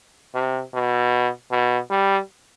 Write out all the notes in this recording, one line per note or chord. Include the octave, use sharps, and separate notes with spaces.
C3
B2
B2
G3